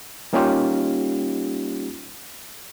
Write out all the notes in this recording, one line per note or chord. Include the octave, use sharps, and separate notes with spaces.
G3 A#3 C#4 D#4 F4 G4